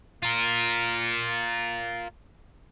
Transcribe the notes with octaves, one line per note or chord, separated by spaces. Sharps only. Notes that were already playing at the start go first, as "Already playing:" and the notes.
F4 A#4